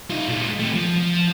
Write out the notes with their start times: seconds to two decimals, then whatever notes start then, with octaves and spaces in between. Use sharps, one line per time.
0.10 D#4 F4
0.28 A#2 G#3
0.59 A3 C4
0.74 F3
0.95 F3